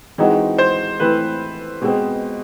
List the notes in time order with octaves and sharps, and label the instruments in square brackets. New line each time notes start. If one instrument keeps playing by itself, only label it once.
[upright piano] E3 G#3 C4 D#4 F#4
[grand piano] C5
[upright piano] E3 A3 C4 E4 [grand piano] B4
[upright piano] B2 G#3 C4